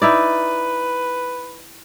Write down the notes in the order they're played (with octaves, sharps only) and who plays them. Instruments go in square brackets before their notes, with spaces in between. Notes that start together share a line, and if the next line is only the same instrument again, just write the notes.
[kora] D#4 E4 D5 [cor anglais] B4